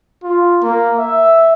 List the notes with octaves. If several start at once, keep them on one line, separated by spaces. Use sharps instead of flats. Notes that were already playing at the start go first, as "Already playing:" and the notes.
F4
A#3
E5